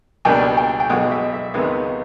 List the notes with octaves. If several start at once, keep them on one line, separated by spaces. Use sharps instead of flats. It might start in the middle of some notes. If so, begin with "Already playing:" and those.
C#2 B2 G3 A#3 D4 G5
G5
G5
B1 B2 G#3 F#5
E5
E5
C#2 C3 D#3 G#3 B3